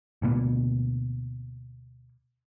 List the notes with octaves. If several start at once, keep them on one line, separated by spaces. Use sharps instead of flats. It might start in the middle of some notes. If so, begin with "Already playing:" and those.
D2 B2 A#3 B3